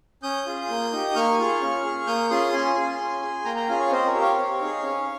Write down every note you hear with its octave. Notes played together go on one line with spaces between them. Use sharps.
C#4 D#6 G6
F4 G#4
A#3
D#4 G4
A#3 C#6 F6
F4 G#4
C#4
G#4
A#3 D#6 G6
C#4 F4 G#4 C6 D#6
C#4 G#5 C6
F4 G#4
C#4
G#4
A#3 G5 A#5
G5 A#5
C#4 F4 G#4 F5 G#5
C#5 F5
C4 C5 D#5
A#4 C#5
G4
C#5 F5
C4
D#4 G#4
C#4